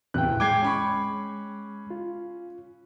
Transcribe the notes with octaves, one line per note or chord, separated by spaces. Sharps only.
D1 E2 C3 G5 F#6
G#3 G5 D6 G#6 C7
C#4 B5 C#6
F4